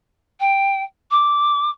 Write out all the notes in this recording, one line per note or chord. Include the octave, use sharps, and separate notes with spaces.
G5
D6